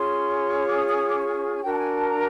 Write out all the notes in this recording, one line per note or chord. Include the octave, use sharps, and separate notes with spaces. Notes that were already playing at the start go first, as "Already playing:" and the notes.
Already playing: C#4 F4 G#4 C#5 C6
D6
D#6
D#6
D#6
D6
C#6
G#5
D4 F#4 A#4 G5
A5
G#5
A5
A#5